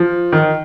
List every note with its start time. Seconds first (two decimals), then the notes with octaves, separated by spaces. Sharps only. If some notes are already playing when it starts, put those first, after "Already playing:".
Already playing: F3
0.32 D#3